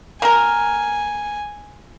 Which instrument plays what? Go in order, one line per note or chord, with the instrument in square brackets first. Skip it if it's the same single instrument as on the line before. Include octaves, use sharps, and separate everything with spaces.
[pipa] A#3 A#4 [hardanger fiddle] G#5